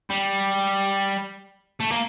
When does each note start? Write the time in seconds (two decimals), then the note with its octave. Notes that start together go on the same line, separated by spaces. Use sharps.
0.10 G3
1.81 A3
1.92 A#3